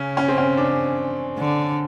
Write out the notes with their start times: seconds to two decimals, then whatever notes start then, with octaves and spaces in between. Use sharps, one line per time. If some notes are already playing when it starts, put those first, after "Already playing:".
Already playing: C#3 C#4
0.17 C#4
0.28 C4
0.38 C#4
0.57 D4
1.38 D3